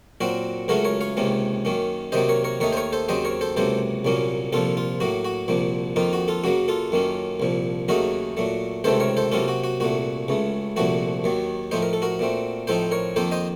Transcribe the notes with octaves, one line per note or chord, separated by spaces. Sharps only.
A#2 F#3 C4 F#4 A#4
C#2 C#3 F#3 A3 C#4 F#4 A#4
A#4 C#5
C#5 F5
C#2 C3 D#3 A#3 C#4
F#2 D#3 A#3 C#4
C3 D#3 F#3 A#3 C5 D#5
A#4 C#5
A#4 C#5
D#2 D#3 A3 D#4 A#4 C#5
C5
A#4 C#5
A4 C5
D#2 C#3 F#3 C4 C5 D#5
A#4 C#5
A4 C5
C#2 C3 F#3 A#3 A4 C5
C2 A#2 F#3 A#3 C#4
C2 A#2 F3 F4 A4
F4
A2 F#3 A#3 F#4
F#4
C2 A#2 F3 A#3
F2 D#3 A#3 D#4 F4
F#4
F4 A4
F#2 C#3 F#3 A#3 F#4
F4 A4
F#2 D#3 A#3 C#4
C2 A#2 F3
D#2 C#3 F#3 A3 D#4 F#4 A#4
A#2 F#3 A3
C#2 C3 D#3 A3 C4 A4 C5
A#4 C#5
A4 C5
C3 F#3 A#3 C#4 F4 A4
F#4
F#4
C2 A#2 A3 F#4
C#2 C#3 A3
C2 A#2 F3 A3 F#4
D#2 D#3 F#3
A2 F3 A3 D#4 C5
A#4
A4
F#4 A#4
A#2 A3 C4
A2 F3 C4 D#4 A4 C5
A#4 C#5
F2 D#3 A#3 A4 C5
C5 D#5